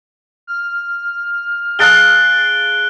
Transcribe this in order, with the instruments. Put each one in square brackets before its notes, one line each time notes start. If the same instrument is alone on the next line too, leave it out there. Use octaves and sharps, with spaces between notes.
[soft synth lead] F6
[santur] G#4 F5 A5 [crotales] F#6 D7 G7